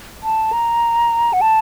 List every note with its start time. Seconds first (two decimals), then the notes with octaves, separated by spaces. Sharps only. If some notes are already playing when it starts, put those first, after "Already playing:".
0.23 A5
0.53 A#5
1.33 F#5
1.41 A5